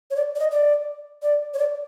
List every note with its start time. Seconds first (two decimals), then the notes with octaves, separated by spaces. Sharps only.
0.11 C#5
0.16 D5
0.35 D5
0.40 D#5
0.51 D5
1.23 D5
1.54 C#5
1.58 D5